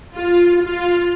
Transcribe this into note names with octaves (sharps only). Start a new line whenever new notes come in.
F4
F4